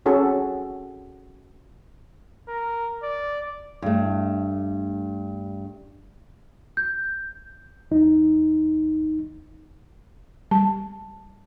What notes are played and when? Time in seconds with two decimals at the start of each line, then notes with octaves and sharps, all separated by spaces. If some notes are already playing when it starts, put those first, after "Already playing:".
0.06 C4 C#4 F#4 G#4 A4
2.48 A#4
3.03 D5
3.82 G2 A3
6.77 G6
7.91 E2 D#4
10.51 G3 A5